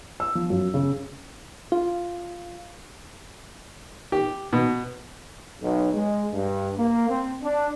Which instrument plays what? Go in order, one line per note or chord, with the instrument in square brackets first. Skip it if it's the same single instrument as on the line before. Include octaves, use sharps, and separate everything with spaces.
[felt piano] E6
F3
F#2
C#3
[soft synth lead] F4
[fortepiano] G4
B2
[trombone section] B1
G#3
G2
A#3
C4
D4